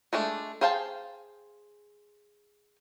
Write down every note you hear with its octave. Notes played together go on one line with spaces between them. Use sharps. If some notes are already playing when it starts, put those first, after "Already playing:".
G#3 A3 D4
G#4 C5 F5 G5 A5